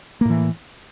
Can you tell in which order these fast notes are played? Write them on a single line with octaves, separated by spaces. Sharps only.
A#3 A2 E3